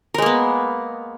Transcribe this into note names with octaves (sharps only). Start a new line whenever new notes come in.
G#3 A#3 B3 A#4